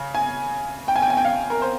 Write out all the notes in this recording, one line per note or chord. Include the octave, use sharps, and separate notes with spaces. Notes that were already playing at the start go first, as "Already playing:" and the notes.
Already playing: C#3
G#5
G5
G#5
G5
G#5
G5
F5
A#4
C5